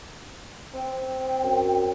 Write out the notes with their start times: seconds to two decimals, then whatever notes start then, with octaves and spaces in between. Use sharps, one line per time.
0.74 C4 G5
1.43 F#2